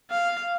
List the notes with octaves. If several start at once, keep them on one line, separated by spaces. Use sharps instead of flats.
F5